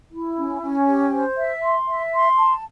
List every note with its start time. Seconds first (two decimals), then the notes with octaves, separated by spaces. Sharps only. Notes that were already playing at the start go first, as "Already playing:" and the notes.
0.11 E4
0.37 C#4
0.62 C#4
0.86 G4
1.12 C5
1.37 E5
1.62 C6
1.88 E5
2.12 C6
2.37 A5